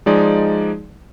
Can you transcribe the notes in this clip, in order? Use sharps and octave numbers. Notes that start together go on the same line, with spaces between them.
F3 G#3 D#4 G#4 D5